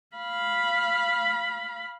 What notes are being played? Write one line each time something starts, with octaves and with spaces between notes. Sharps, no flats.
F5 B5